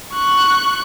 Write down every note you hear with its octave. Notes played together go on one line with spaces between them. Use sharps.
C#6 F#6